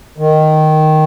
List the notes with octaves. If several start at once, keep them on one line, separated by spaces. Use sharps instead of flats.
D#3